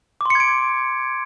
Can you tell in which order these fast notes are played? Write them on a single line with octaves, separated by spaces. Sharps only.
D6 C6 C#7 G#6 D7